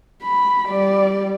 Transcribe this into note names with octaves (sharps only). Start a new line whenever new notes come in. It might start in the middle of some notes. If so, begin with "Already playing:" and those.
B5
G3 D5